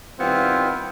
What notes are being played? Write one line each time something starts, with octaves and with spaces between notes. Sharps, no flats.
D#3 G3 B3 C4 E4 F4